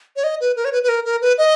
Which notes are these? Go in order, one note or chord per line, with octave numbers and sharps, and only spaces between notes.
C#5
D#5
B4
A#4
C#5
B4
B4
A#4
A#4
B4
D#5